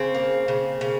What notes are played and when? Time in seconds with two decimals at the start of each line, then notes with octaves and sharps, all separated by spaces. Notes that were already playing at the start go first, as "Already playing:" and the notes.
Already playing: C#3 C4
0.15 A#3
0.48 C#3
0.81 C#3